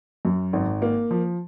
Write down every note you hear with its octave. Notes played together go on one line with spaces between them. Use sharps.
F#2
G#1
A#3
F3